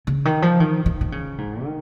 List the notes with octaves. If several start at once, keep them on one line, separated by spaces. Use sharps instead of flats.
C#3
D#3
F3
D#3
D#3
D#3
C#3
G#2
D#3